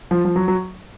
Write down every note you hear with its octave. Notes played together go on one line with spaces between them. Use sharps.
F3
F3
F#3
F#3